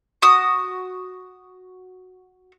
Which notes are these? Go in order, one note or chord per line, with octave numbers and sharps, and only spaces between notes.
F#4 D#6